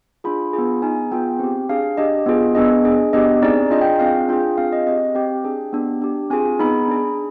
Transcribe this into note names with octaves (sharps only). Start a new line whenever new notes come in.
D4 F4 G#4 B5
B3 F4 G#4
B3 D#4 G#4 G#5
B3 F4 G#4 G5
C4 G4
D4 G#4 F5
D4 G4 D#5
B3 F4 G#4
B3 D4 G#4 D#5
D4 G#4
B3 D4 G4 D#5
C4 D#4 G#4 D5
D4 F4 G#4 D#5
G5
C4 F4 G#4 F5
D4 F4 G#4 G5
C4 F4 G#4 F5
D#5
C4 G4 D#5
C4 G4 G5
D4 G#4
B3 D4 G4
D4 G4
C4 F4 G#4 G#5
B3 D#4 G#4 B5
D4 G#4